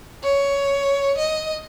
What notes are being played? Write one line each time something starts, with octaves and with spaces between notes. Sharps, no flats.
C#5
D#5